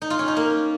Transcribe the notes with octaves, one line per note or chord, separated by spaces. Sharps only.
D#4
F4
C#4
D#4
A#3